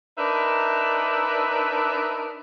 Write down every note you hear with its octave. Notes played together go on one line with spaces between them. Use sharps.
D4 D#4 A#4 B4 D5 E5